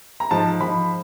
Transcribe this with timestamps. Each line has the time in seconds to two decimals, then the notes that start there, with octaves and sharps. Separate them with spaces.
0.20 A#5
0.31 G#2 F3 A5
0.61 G#2 F3 B5